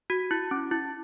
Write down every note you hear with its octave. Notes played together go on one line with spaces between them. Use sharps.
F#4
E4
C#4
E4